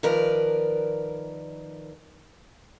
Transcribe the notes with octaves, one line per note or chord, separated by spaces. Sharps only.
D#3 F3 A#4 B4 D5